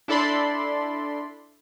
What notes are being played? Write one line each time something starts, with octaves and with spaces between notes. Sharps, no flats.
D4 E4 A4 D5 B5 C6